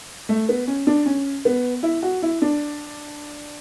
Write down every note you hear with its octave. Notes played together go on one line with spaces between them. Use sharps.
A3
B3
C#4
D4
C#4
B3
E4
F#4
E4
D4